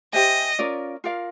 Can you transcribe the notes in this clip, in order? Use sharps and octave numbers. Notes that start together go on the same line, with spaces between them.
G4 C5 D#5 E5 G#5
C#4 F4 A#4 D5
F4 A#4 D5 F5